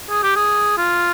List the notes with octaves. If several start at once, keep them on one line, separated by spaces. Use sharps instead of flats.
G#4
G4
G#4
F4